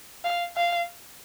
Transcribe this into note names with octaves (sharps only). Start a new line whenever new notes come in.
F5
F5